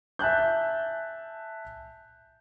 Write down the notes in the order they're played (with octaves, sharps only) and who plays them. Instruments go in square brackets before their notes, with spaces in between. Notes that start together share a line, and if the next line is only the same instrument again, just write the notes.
[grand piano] E5 G#5 A5 F#6 G6